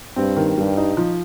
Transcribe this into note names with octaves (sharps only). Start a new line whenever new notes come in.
G2 C4
D#3
G2 G3
D#4
F3